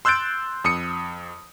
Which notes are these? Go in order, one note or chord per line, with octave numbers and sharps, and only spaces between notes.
C6 E6 F#6 G6 A6 D7
F2 D#6 C#7